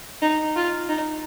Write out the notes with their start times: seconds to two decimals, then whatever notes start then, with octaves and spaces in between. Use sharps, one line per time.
0.22 D#4
0.56 F4
0.89 D#4